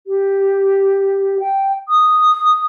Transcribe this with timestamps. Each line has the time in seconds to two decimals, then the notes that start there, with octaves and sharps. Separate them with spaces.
0.07 G4
1.39 G5
1.88 D#6